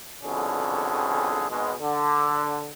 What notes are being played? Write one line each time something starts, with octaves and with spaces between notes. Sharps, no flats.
C2 F2 B2 D3 C#4 G#4
G#1 B2 G#3
D3